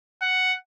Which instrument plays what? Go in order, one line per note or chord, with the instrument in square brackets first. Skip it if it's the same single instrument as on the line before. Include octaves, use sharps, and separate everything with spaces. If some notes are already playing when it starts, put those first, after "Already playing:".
[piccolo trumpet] F#5